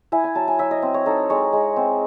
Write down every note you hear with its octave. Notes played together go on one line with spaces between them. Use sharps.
E4 G#5
G#5
F#3 A5
G#5
F#3 E5
D#5
C4
C#5
D#4 A4
G#3 C#5
G#3
C4